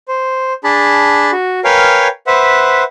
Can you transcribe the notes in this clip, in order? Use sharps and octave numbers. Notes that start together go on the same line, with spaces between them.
C5
D4 G#4 A5 B5
F#4
A#4 B4 C#5 F5 G5 G#5
B4 C5 E5 F#5